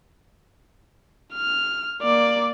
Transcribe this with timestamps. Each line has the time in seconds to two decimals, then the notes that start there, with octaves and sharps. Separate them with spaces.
1.34 F6
2.02 A#3 D5